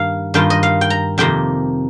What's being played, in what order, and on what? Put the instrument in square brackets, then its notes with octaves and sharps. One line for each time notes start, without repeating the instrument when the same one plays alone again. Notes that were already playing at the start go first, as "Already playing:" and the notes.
Already playing: [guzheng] G2 D#3 A#3 F5
G2 D#3 A#3 F4 G5
D#5
F5
G5
A#5
F2 C3 D#3 A#3 G5